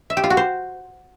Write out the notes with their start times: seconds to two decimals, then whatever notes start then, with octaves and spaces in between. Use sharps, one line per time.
0.10 E5
0.17 G4
0.24 F4
0.30 F#4
0.37 C5